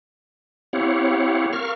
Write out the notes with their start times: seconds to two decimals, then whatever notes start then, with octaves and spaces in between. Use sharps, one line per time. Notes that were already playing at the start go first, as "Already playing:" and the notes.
0.73 C4 E4 G4 C#5 F5 F#5
1.53 A#4 F5 C#6 F6